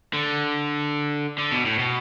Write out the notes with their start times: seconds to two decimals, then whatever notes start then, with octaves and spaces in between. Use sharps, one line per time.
0.14 D3
1.38 D3
1.52 B2
1.65 A2
1.79 B2